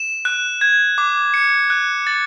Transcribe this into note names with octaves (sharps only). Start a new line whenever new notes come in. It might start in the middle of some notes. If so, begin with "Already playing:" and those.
Already playing: E7
F#6
G#6
D6
C#7
F#6
A6